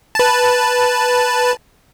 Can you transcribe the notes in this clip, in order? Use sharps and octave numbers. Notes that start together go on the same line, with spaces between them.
B4 A5